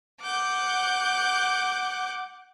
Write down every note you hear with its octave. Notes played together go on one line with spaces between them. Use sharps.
F#5 D6 G6